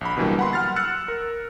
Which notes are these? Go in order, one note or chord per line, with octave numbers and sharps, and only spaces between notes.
A#1 B5
B2 D3 E3 F#3 G3 A#3
F#5 B5 C6
F#5 F6 A6
E6 F#6 A6 C#7
A#4